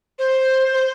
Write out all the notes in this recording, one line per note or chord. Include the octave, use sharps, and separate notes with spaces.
C5
C5